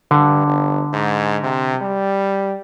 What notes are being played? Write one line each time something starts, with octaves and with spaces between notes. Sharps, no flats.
G2 D3
G1
G#2
C3
G3